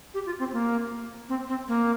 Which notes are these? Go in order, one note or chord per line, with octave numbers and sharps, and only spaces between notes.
G4
F4
C4
A#3
C4
C4
A#3